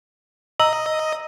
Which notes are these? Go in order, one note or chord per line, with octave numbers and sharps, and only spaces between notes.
D#5 A#5 E6 F#7